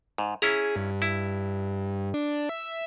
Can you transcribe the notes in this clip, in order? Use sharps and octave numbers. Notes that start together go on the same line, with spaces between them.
G#2
C#4 E4 G#4 A#5
G2
E4
D4
E5